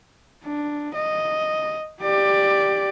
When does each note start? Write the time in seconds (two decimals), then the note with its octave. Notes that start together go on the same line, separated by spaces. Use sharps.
0.44 D4
0.95 D#5
2.02 G4 D5